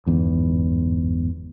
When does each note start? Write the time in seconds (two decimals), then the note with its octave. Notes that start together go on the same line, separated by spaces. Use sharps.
0.06 G1 E2 G#2